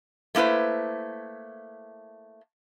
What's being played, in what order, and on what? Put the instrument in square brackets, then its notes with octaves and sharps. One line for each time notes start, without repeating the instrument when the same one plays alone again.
[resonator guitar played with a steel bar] A3 A#3 E4 B4 C5